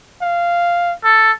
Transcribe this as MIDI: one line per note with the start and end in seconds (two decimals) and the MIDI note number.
0.22 0.94 77
1.04 1.32 69